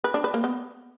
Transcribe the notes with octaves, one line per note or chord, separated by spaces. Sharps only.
B4
D4
B4
A#3
B3